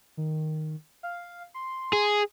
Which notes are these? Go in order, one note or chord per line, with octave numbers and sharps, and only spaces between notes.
D#3
F5
C6
G#4